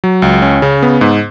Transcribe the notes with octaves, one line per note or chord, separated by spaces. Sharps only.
F#3
C#2
C#4
C#3
B3
G#2